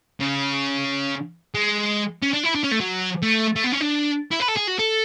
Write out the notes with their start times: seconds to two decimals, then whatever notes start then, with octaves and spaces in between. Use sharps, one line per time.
0.20 C#3
1.54 G#3
2.22 C#4
2.33 D4
2.44 E4
2.55 D4
2.64 C#4
2.72 A3
2.80 F#3
3.22 A3
3.56 A3
3.64 B3
3.72 C#4
3.81 D4
4.31 E4
4.40 B4
4.48 A4
4.56 G#4
4.67 F#4
4.79 A4